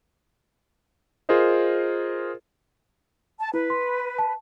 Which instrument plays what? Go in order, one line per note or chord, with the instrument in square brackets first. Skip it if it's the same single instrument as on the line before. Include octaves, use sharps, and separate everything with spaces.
[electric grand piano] F4 G#4 A#4 C5 D#5
[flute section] A5
[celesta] E4 [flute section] B4
[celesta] C6
A5